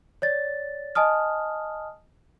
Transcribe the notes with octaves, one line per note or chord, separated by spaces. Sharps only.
C#5 D5 A6
D#5 G#5 A5 D#6 F6